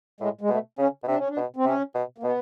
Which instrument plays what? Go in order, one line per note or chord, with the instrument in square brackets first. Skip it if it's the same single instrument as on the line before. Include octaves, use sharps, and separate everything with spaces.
[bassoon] A2 [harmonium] G#3
[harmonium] G#3
[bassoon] B2 [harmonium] A3
[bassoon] C#3 [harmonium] C#4
[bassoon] B2
[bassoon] C3 [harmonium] D4
[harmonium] C#4
D4
[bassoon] B2
[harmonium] C4
[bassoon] C3 [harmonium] C#4
[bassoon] B2
[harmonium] A#3
[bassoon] B2 [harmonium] B3